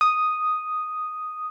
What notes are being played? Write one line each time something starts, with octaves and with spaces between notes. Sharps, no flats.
D#6